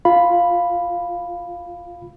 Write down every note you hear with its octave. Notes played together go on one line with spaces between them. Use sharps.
F4 F5 B5